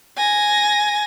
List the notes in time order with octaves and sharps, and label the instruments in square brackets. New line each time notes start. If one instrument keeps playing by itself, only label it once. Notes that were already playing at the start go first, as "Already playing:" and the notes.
[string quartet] G#5 A#6